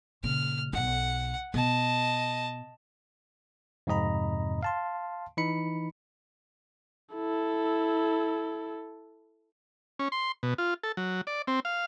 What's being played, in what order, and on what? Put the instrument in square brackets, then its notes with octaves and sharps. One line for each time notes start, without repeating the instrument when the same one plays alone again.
[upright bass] A#2 C#3 [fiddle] F6
[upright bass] B1 D#4 [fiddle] F#5
[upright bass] B2 [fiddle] D#5 A5
[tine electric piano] F2 G#2 C3 D#5 A#5 B5
F5 A5 C6
E3 D#4 B5 C#7
[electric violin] E4 A4
[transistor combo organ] C#4
C6
B2
F4
A4
F#3
D5
C4
F5